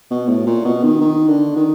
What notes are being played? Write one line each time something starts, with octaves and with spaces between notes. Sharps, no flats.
B2
A2
A#2
B2
D#3
D#3
D3
D#3